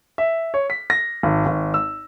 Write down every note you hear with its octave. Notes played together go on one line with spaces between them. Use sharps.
E5
C#5
B6
A#6
G#1
G#1
E6